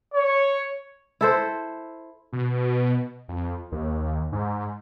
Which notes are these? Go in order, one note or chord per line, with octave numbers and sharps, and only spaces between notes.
C#5
E4 A4 C5
B2
F2
D#2
G#2